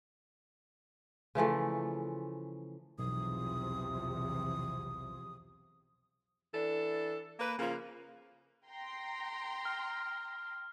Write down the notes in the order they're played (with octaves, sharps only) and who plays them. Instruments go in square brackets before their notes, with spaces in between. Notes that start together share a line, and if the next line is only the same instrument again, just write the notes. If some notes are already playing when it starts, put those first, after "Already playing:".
[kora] C#3 E3 F3 A3
[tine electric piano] B1 [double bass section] E2 C3 F3 [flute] D#6
[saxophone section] E3 D4 A4
A#3 B4
C#3 F3 A#3
[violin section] G5 A#5 C6
[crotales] F6